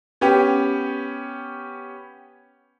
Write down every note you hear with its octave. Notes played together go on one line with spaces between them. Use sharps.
B3 C#4 G4